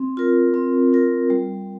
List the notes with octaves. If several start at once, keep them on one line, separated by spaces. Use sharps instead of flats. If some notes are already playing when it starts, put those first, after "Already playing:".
Already playing: C4
F4 A#4
C4
F4 A#4
G3